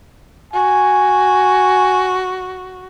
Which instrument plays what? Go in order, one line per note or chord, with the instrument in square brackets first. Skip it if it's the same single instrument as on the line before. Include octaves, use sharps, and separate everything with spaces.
[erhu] F#4 [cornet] G#5